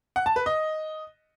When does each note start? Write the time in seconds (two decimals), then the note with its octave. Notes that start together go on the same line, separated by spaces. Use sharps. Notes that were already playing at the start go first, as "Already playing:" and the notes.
0.16 F#5
0.26 A5
0.36 B4
0.46 D#5